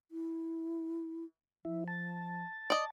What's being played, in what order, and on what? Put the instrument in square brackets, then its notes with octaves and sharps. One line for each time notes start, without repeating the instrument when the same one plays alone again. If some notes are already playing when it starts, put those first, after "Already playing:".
[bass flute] E4
[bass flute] F3 [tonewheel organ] E4
[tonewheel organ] A5
[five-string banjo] D5 D#5